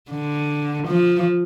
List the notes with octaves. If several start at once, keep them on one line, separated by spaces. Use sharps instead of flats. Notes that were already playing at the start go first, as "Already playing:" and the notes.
D3
F3